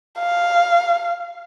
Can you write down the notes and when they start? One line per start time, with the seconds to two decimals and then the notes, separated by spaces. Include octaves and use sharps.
0.19 F5